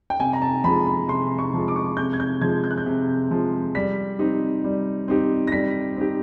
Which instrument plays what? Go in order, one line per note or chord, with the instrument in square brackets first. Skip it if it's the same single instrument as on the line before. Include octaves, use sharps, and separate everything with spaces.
[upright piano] G5
[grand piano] C3 [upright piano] G#5
[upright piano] A#5
A5
[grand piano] F3 G#3 [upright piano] B5
[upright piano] B5
[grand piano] C3 [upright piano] C6
[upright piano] C#6
[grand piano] F3 G#3
[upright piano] D6
C#6
D6
[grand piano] C3 [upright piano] G6
[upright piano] G#6
G6
[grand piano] F3 G#3 [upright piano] G#6
[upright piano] G6
F#6
G6
[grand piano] C3
F3 G#3
[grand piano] G3 [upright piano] B6
[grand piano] C4 D#4 G4
G3
C4 D#4 G4
[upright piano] A#6
[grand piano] G3 [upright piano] B6
[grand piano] C4 D#4 G4